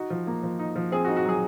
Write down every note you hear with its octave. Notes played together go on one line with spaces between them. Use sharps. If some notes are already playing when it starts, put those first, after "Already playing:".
Already playing: D#4 F#4
F3
A#3
F3
D#4
F3
C4 G#4
F#4
D#4
F#4
F#3 G#4